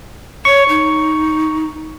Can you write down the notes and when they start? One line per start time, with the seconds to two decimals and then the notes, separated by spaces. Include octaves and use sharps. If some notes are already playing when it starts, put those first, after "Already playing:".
0.45 C#5 C#6
0.69 D#4